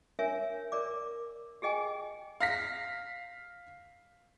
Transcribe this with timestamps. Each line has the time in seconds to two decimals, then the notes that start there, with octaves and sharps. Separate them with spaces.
0.19 D4 A#4 C#5 E5 G#5
0.72 A#4 D5 D6
1.62 G4 G#4 D#5 G5 G#5
2.40 F5 A#6 B6